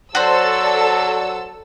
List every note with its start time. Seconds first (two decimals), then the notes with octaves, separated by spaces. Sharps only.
0.15 F#3 F#4 A4 C5 D5 E6